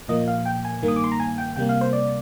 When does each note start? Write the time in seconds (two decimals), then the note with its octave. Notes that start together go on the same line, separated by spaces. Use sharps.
0.08 A#2 F3 A#3 D#5
0.28 F5
0.45 G5
0.65 G#5
0.83 G2 D#3 A#3
0.88 D#6
0.96 D6
1.04 C6
1.12 A#5
1.20 G#5
1.38 G5
1.56 C3 G3 A#3 G5
1.69 F5
1.81 C5
1.93 D5